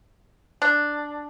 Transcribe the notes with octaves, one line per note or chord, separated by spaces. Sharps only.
D4